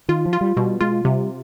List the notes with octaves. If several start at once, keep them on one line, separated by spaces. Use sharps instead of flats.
D#3 F4
F3
F4
G3
B2 G3
G#3 F4
C3 G3